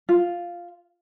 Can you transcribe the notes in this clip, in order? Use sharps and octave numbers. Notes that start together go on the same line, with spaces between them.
F4